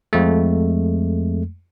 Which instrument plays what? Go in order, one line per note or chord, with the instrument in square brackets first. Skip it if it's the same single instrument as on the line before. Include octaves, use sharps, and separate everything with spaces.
[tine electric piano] F2 G#3 A3